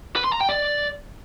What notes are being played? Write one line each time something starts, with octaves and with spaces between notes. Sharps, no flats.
B4
C6
A#5
G5
D5